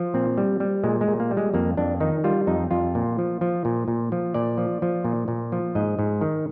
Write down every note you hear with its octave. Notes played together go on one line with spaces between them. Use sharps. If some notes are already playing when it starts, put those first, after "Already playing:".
Already playing: F3
A#2 C4
G3
G3
A#2 G#3
G#3
A#2
A#3
G3
G#3
F2 A#3
F2 D4
D#3 D#4
G3 F4
F2 D#4
F2 F4
A#2
F3
F3
A#2
A#2
F3
A#2 D5
F3
F3
A#2
A#2
F3
G#2 D#5
G#2
D#3